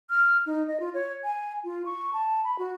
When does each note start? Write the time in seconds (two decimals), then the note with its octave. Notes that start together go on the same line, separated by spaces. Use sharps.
0.10 F6
0.46 D#4
0.68 D#5
0.80 F4
0.94 C#5
1.24 G#5
1.64 F4
1.86 C#6
2.13 A5
2.44 B5
2.59 F#4